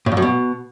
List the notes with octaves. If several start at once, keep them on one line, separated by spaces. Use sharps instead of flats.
A2
F2
F#2
B2